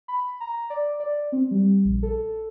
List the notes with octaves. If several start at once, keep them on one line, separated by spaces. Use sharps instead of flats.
B5
A#5
D5
D5
C4
G3
A#1
A4